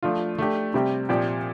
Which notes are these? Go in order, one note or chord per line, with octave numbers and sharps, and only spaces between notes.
F3 A3 D4 F4
A3 D4 G4
C3 G3 C4 G4
A#2 F3 C4 G4 D5